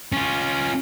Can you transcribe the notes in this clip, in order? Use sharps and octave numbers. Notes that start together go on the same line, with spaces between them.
C#4 F4